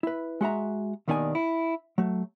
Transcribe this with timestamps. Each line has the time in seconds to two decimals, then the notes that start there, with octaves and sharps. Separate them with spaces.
0.03 E4 B4
0.41 G#3 F#4 E5 A#5
1.08 D#2 B2 D#3 D4 D5 G#5
1.35 E4
1.98 F#3 A3